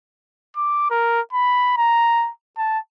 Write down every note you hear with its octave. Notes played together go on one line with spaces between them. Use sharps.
D6
A#4
B5
A#5
A5